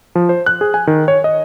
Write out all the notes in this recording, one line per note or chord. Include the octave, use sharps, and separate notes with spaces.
F3
C5
F#6
G#4
G#5
D#3
C#5
D#5